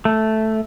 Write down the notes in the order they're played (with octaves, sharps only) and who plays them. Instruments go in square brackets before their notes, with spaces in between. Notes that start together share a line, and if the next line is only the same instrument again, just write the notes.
[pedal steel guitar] A3